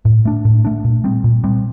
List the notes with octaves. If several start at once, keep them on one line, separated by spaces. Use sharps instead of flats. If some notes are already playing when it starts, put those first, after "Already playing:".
A2
A3 D4
A2
A3 D4
A#2
G3 C4
A#2
G3 C4